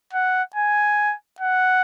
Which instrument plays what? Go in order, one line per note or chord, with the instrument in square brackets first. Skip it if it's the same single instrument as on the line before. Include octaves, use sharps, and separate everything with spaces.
[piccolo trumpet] F#5
G#5
F#5